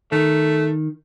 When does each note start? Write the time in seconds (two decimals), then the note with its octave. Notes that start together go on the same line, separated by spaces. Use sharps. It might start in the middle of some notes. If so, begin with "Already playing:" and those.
0.12 D#3 A3